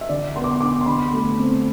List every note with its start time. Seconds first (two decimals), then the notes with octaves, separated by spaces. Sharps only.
0.01 E5
0.09 D3 D5
0.36 B3 C6
0.44 D6
0.51 C6
0.61 D4 D6
0.81 C6
0.86 D3 B5
1.13 A3
1.39 C4